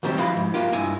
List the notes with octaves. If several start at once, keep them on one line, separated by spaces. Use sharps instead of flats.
D#3 F#3 G3 C4 G4
F3 E4 F5 B5
G#2
A#3 F4 G4
G2 E4 G#5